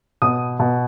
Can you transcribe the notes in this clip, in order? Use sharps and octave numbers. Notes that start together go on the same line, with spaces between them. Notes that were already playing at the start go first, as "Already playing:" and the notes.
B2 D#6
B2